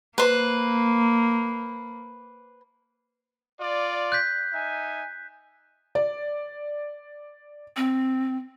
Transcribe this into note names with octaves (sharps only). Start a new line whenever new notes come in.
A#3 B4 C5
F4 D5
F#6 G6 B6
D#4 E5 G#5
D5
C4